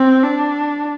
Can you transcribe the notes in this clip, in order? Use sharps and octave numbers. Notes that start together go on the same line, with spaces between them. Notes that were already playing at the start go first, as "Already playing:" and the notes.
Already playing: C4
D4